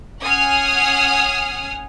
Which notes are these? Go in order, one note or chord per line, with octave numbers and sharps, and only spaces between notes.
C#4 F#5 G#5 D#6 F6 C7